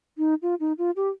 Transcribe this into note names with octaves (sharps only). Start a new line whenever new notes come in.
D#4
F4
D#4
F4
G4